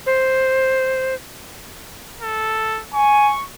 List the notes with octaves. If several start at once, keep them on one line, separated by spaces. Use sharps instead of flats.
C5
A4
G#5 C#6